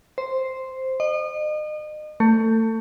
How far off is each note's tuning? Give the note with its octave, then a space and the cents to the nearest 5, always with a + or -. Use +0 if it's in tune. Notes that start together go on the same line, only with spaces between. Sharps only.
C5 +0
D#5 -35
A3 +30